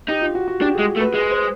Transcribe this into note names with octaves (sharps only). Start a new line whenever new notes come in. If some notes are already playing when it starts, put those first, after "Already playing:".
D#4 G4
F4
F#4
F#4
D4 G4
G#3 G#4
A3
B4
G#3 B4
C5